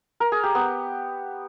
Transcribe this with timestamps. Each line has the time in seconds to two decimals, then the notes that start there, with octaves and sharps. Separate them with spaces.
0.20 A#4
0.32 G#4
0.43 G4
0.55 B3